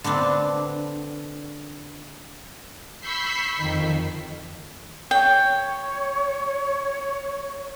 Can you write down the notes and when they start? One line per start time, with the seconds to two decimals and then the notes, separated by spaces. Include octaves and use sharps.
0.04 D3 B3 C4 D4
3.00 B5 C#6 E6 G6 B6 C7
3.57 F2 D#3
5.11 C#5 G5